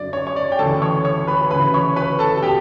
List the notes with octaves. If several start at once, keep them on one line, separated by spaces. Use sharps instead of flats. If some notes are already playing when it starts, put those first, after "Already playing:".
Already playing: F#2 D3 D5
C#5
C#5
D5
G5
D2 C#3 E3 A4 A5
C#5 C#6
C#5 C#6
B4 B5
D2 C#3 E3 B4 B5
C#5 C#6
B4 B5
A4 A5
A5
B2 G4 G5